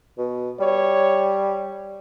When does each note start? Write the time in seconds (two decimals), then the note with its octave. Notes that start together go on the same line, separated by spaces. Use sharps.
0.18 B2
0.60 G3 C#5